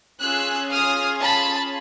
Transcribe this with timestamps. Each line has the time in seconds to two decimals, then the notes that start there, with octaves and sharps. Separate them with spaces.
0.21 C#4 F4 G#4 E6 F#6
0.72 D#6 F6
1.22 A5 B5